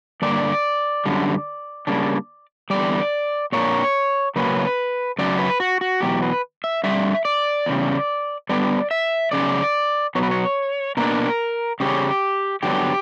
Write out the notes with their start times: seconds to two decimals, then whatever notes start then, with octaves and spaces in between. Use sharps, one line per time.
0.22 G2 D3 A#3 D4 D5
1.05 F#2 D3 G3
1.87 C#3 G3 A#3 D4
2.70 E2 D3 G3 D5
3.52 A#2 A#3 D4 C#5
4.36 C#3 F#3 A#3 C#4 B4
5.19 F#2 C#3 F#3 D5
5.39 B4
5.60 F#4
5.81 F#4
6.01 E2 B2 F#3 G4
6.22 B4
6.64 E5
6.84 G2 D3 G3 E5
7.25 D5
7.66 E2 C#3 G3
8.49 D3 G3 B3 D4 D5
8.91 E5
9.31 F#2 C#3 D5
10.15 B2 F#3 B3 C#5
10.23 B4
10.31 C#5
10.97 B2 A#3 D4 A#4
11.80 C#3 G3 C#4 G4
12.63 D3 F#3 B3 D4 G4